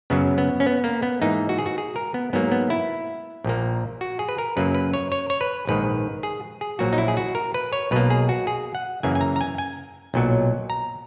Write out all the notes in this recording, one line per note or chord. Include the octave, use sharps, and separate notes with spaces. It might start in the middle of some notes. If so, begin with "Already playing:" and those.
F#2 C#3 F#3 B3
B3
C#4
B3
A#3
B3
G#2 E3 A#3 D#4
F#4
G#4
F#4
G#4
A#4
B3
G#2 F#3 A#3 B3
B3
E4
A#1 A#2 A#3
F#4
G#4
B4
A#4
F#2 C#3 F#3 A#3 B4
B4
C#5
C#5
C#5
B4
A#1 G#2 D#3 B4
G#4
G#4
A#1 A#2 F#3 A#3 F#4
D#4
E4
G#4
F#4
A#4
B4
C#5
B1 B2 A#3 B4
G#4
F#4
G#4
F#5
F#2 C#3 E3 A#3 G#5
G#5
A#5
A#5
G#5
G#5
B1 A#2 F#3
A#5